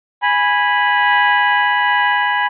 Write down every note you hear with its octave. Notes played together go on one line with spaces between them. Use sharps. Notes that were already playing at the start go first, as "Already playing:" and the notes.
G#5 B5